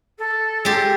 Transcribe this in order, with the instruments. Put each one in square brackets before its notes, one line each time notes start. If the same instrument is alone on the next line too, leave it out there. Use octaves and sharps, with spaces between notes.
[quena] A4
[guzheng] G#3 G4